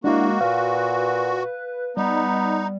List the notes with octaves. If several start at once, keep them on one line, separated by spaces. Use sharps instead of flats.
G#3 A#3 D4 E4 F#4
A#2 B4 F5
G3 B3 D#4